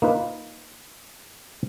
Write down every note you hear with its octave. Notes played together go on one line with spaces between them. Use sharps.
A#3 D#4 F4 B4